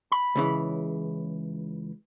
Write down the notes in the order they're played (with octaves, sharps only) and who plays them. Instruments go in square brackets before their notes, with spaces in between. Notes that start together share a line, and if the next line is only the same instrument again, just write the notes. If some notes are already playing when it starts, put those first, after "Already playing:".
[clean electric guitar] B5
[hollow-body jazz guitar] C#2 C#3 E3